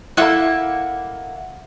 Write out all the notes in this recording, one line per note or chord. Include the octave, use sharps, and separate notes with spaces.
A#3 E4 A4 E5 F#5 B5